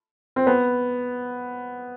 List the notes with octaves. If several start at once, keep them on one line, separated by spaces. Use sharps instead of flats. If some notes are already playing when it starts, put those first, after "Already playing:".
C4
B3